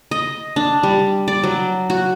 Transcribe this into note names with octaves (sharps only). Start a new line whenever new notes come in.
D#5
D4
G3
D5
F#3
F#4